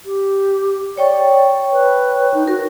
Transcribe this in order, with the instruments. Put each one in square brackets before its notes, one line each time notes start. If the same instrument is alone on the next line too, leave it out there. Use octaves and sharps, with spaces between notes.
[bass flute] G4
[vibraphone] C#5 G5 C#6 [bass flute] D5
[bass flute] B4
D#4
[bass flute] F#4 [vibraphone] A#4